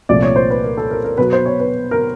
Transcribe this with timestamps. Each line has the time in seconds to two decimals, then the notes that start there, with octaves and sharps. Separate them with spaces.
0.09 C2 A#2 F3 A3 D5
0.22 C#5
0.36 C5
0.50 B4
0.64 A#4
0.77 A4
0.91 A#4
1.04 A#4
1.18 B2 F#3 B3 B4
1.33 C5
1.46 C#5
1.60 B4
1.91 A#4